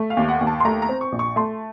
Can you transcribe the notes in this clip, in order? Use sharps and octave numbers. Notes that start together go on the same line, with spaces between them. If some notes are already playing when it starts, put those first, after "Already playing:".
Already playing: A3
F5
D#2
F#5
D#2
A5
C6
A3 A#5
A#5
C4
C#6
A#1
C#6
A3 C6